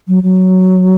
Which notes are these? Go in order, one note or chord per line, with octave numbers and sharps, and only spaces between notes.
F#3
F#3